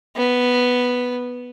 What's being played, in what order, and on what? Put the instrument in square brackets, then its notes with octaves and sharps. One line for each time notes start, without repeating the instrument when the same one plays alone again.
[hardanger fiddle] B3